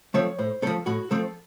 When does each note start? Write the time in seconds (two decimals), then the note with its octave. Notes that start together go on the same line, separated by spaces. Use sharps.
0.14 F3 A3 C4 C#5
0.39 A2 C5
0.62 F3 A3 C4 A4
0.86 A2 F#4
1.11 F3 A3 C4 A4